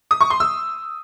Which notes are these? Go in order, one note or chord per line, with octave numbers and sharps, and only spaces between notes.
D#6
C#6
C6
E6